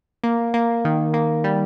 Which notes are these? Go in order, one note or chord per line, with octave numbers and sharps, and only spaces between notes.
A#3
A#3
D#3
A#3
G3